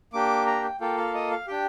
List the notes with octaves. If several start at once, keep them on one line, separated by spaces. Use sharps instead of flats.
A#3 D4 G4 D6
A#5
G5
A#3 F4 A4 G5
F5
D#5
F5
D4 G4 G5